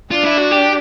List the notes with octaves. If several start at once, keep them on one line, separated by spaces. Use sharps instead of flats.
D4 F4
E4
F#4
G4